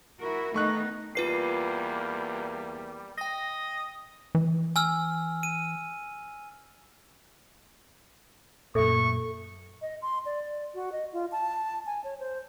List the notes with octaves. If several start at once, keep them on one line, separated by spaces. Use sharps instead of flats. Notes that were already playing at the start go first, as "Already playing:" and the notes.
E4 F#4 A#4
D#3 A3 B3 D#4 C#6 F#6
E2 G3 A#3 F4 B4 C7
D#5 G5 A#6
E3
G#5 E6 F6
D#7
F#2 A#2 A3 A4 E5 C#6
D#5
C6
D5
F#4
D#5
F4
A5
G#5
C#5
C5